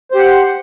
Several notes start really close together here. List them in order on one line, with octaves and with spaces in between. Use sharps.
C5 G4 F#5